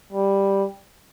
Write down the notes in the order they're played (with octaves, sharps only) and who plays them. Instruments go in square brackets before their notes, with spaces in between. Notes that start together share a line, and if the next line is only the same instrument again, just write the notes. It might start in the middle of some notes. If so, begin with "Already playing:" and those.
[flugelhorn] G3